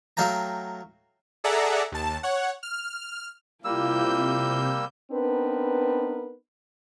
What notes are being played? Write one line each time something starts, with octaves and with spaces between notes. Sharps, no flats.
F#3 A3 F5 G5 A#5
G#4 A4 D5 E5 F#5 A#5
D#2 A5
C#5 F#5
F6
C3 G3 A#3 E4 F4 E6 G6
B3 C4 D4 D#4 A#4 B4